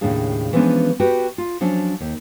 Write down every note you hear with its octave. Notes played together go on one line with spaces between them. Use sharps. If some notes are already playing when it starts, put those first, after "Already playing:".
D#2 A2 C#3 D4 G#4 F5
E3 F3 G#3 B3 C#4 D4
F#4 G4 B4 G5
F4
F3 F#3 C#4 D4
D#2